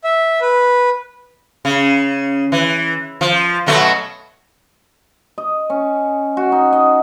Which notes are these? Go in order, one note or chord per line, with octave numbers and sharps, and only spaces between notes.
E5
B4
C#3
E3
F3
B2 F#3 A3
D#5
C#4
F#4
D#4
D#5